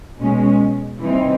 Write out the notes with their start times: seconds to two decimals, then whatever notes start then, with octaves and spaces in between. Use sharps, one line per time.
0.20 B2 G#3 C#4
1.02 C3 E3 G3 C4 D#4